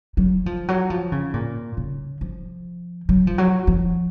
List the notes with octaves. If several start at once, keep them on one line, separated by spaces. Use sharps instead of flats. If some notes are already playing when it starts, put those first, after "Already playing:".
F#3
F3
F#3
F3
C#3
A#2
C#3
F3
F#3
F3
F#3
F3